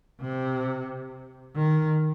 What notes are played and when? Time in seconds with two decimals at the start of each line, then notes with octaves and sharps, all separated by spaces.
0.21 C3
1.55 D#3